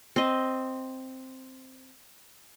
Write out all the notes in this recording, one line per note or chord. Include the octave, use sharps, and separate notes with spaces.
C4 D#5